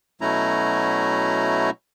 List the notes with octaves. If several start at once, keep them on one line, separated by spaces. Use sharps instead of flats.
B2 F#3 A3 C#4 E4 A#5